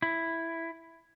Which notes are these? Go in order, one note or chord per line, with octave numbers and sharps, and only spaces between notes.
E4